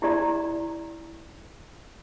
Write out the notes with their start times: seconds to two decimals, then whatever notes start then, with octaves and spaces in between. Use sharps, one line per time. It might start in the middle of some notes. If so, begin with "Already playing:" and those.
0.02 E4 G4 D5 A#5